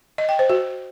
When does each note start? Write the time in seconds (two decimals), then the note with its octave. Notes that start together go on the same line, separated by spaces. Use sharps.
0.18 D#5
0.29 G5
0.39 C5
0.50 F#4